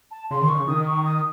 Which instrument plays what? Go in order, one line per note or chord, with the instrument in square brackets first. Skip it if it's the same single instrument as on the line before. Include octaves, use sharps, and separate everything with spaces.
[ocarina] A5
[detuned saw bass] C#3 [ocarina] C6
[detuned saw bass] D#3 [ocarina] C6
[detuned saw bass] C#3 [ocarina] C#6
[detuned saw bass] D#3 [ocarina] D#6
[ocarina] C#6
D#6